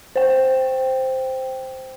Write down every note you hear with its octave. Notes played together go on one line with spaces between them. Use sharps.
C5 G5